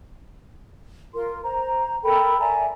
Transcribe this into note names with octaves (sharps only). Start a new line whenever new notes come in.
F4 A#4 C6
C5 A#5
A4 A#4 G5 B5
D5 E5 G#5 A#5